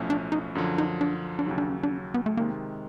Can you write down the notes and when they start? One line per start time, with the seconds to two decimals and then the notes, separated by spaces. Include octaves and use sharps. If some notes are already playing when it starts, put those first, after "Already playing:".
Already playing: B1 A2 F3 A3 C#4
0.10 D4
0.32 D#4
0.55 F#2 D3 F3
0.78 D#4
1.01 D4
1.39 D4
1.46 D#2 C#3 F#3 D#4
1.58 D4
1.70 C#4
1.83 D4
1.91 C#4
2.14 B3
2.26 A3
2.37 C3 D#3 G#3 A#3